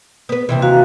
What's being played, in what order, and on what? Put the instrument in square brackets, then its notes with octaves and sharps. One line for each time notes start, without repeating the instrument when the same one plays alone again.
[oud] B3 B4
D#2 C3 E3
[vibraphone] F#4 F5 A#5